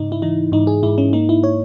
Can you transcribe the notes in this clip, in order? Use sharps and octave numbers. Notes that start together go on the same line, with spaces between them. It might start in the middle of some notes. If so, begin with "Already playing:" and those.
Already playing: G#2 C#3 D#4
E4
E3 D#4
G#2 D#4
G#4
G#2 E4
C#4
A#3 D#4
E4
C#5